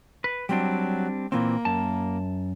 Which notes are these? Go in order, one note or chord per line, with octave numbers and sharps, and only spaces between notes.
B4
F#3 G3 C4 D4
A#2 E3 A#3 C4
F#2 A5